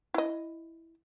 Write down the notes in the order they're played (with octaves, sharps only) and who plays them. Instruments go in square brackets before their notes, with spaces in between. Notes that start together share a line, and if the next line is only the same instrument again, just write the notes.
[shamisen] E4 D#5